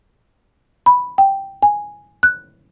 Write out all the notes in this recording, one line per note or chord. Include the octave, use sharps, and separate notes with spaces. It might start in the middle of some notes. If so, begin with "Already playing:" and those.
B5
G5
G#5
F#6